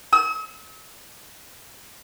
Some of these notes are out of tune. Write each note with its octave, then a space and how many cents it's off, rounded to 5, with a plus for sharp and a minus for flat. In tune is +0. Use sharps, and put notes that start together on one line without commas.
E6 -45